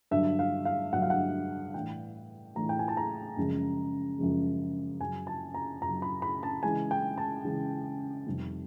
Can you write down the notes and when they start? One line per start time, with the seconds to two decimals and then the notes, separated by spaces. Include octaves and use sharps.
0.11 G2 D3 F#3 E5
0.39 F5
0.65 F5
0.93 G2 D3 F#3 F#5
1.02 F5
1.10 F#5
1.74 A2 E3 A3 D4 G5
2.55 A2 E3 A3 D4 A#5
2.69 G5
2.79 G#5
2.88 A5
2.97 A#5
3.37 F#2 C#3 F3 G#3
4.19 F#2 C#3 F3 G#3
5.00 F#2 C#3 F#3 G#5
5.27 A5
5.54 A#5
5.82 F#2 C#3 F#3 A#5
6.02 B5
6.22 B5
6.43 A5
6.63 C#3 E3 G#3 G#5
6.91 G5
7.18 A5
7.45 C#3 E3 G#3
8.27 F2 C3 D#3 G3 C4